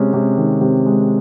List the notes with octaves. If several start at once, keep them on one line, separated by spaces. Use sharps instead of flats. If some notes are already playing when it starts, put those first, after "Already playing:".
Already playing: C3 G#3 C#4
C3
D#3
C3
G#3